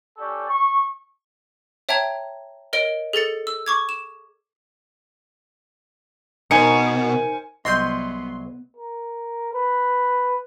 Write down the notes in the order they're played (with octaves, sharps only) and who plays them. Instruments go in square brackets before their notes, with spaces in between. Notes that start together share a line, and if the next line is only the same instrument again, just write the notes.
[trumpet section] C#4 G4 A4 D5
C#6
[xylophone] C#5 E5 G5 A5 A#5 G#6
A#4 C#5 D#5 D7 G7
G#4 A4 A6 C#7
E6
C#6 D6 G#6
E7
[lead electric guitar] B2 [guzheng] D#4 [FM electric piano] A#4 C5 [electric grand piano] G#5 C#7
[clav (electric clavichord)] C2 F#3 G#4 [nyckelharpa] B3 [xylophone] D#5 G6 [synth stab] C6
[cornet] A#4
B4